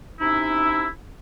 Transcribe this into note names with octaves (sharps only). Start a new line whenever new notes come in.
C3 C#4 D#4 E4